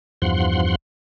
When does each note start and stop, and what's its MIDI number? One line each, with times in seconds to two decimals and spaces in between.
0.22 0.75 40
0.22 0.75 43
0.22 0.75 53
0.22 0.75 78
0.22 0.75 84